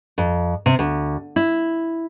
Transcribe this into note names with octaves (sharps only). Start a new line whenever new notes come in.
F2
C3
D2
E4